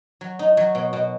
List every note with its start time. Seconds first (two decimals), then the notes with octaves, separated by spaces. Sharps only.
0.21 F#3
0.39 D#4
0.57 F#3
0.75 B2
0.93 B2